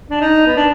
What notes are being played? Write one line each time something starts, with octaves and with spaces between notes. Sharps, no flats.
D4
D#4
B3
D4